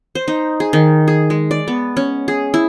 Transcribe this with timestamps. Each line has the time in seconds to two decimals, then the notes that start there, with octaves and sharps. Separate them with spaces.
0.15 C5
0.28 D#4
0.60 G#4
0.73 D#3
1.08 G#4
1.30 G#3
1.51 D5
1.68 B3
1.97 C#4
2.28 G#4
2.54 E4